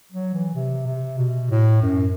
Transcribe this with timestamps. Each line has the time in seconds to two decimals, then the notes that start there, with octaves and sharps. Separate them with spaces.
0.12 F#3
0.34 E3
0.55 C3
0.87 C3
1.18 B2
1.51 A2
1.82 F#2